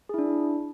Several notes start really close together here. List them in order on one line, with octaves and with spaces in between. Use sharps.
G#4 E4 D4